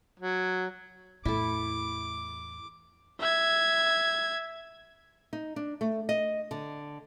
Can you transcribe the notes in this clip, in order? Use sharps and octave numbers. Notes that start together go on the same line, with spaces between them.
F#3
E2 A2 E4 A4 D6
E5 G#6
D#4
D4
A3
D#5
D3